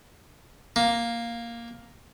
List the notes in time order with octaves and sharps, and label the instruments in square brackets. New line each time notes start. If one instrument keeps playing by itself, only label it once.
[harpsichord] A#3